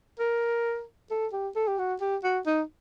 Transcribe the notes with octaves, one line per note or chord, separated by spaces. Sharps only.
A#4
A4
G4
A4
G4
F#4
G4
F#4
D#4